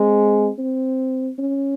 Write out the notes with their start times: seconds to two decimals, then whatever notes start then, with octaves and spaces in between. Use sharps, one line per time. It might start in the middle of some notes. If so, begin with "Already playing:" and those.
Already playing: G#3 C4
0.58 C4
1.39 C#4